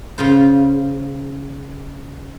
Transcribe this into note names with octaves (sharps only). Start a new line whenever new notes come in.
C#3 F4 C5